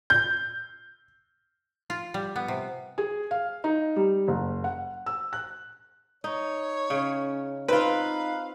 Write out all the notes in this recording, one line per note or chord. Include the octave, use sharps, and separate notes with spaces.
G6
F4
G3
B3
C3
G#4
F5
D#4
G3
F#1
F#5
E6
F#6
D#4 C#5
C#3 C#4
C4 D#4 F4 B4 F5